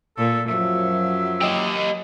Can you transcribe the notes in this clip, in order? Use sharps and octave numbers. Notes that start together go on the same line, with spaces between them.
A#2 A4
F#2 F3 F#3 E5
G4 D#5